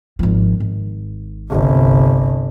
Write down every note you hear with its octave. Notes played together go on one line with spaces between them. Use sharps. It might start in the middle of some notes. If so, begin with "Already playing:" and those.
G#1 F3
G#1
G1 C2